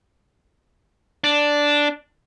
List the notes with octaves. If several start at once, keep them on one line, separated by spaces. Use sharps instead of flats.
D4